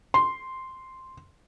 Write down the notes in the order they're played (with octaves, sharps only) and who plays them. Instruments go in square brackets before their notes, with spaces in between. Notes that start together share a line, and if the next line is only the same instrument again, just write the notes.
[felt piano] C6